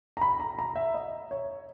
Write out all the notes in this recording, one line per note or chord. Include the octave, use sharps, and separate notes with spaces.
A#5
B5
A#5
A#5
E5
D#5
C#5